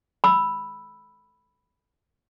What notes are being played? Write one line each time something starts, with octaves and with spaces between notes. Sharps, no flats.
B5 E6